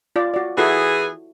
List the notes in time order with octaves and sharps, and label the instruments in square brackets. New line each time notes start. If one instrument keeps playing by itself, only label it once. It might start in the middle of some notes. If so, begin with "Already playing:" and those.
[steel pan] F4 D5
F#4 D5
[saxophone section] E3 B3 G#4 [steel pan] E4 F#4 A4